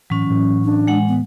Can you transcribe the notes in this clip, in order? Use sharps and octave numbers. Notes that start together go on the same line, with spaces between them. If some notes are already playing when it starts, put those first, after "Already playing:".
A2 E3 F#3 C#4
A2 E3
D4
G#3 F#5
B3